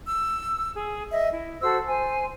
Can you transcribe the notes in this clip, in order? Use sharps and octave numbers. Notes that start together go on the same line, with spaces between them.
E6
G#4
D#5 E5
E4
F#4 A4 C5 E6
C5 G#5